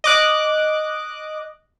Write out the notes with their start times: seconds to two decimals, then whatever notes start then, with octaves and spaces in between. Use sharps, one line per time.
0.04 D#5 D6 F#6